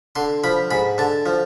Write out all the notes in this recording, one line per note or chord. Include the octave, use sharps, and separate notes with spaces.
D3 C6
F3 B5
G#2 B5
D3 A5
F3